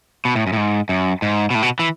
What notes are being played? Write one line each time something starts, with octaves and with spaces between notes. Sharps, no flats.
B2
A2
F#2
A2
G#2
F#2
G#2
B2
A2
B2
E3